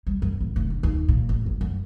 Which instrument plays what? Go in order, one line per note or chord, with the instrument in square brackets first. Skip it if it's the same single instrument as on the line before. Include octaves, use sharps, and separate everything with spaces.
[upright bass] G3
F#2
A1
F1
D3
D#2
A#2
A1
F#2
F#2